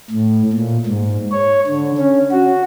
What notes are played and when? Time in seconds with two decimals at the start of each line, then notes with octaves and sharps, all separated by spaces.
0.10 A2
0.52 A#2
0.86 G#2
1.32 C#5
1.66 D3
1.98 C#4
2.31 F#4